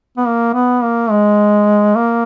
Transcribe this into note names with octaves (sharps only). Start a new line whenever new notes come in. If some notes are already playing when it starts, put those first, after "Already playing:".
B3
A#3
B3
A#3
G#3
A#3